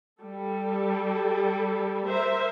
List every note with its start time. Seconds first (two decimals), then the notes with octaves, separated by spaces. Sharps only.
0.20 G3 A4
2.08 A#4 C5 E5